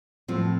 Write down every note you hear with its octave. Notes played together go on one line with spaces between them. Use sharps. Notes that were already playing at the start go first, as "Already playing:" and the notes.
A2 F3 C4